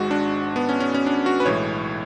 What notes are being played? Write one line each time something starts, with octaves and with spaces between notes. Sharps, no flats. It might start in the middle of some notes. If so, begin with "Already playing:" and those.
Already playing: G#1 G#2 G#3 F#4
D4
B3
C#4
C#4
C#4
D4
F#4
B4
B1 A2 E3 G#3 C#5